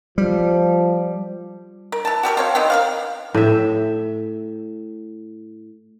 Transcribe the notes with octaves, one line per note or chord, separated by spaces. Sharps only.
F3 G3
A#4
E3 A5
F#4 G4 A4 A#4
C4 C#5 F5
D3 D#3 B3 C4
A#4 D5 F5
A2 E5